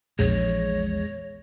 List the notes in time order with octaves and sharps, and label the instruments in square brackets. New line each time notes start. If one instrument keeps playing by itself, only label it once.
[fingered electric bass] A#1 [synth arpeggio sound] E2 G#3 A#6 [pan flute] C#5